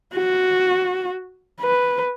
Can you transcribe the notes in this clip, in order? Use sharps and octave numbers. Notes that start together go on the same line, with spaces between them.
F#4
B4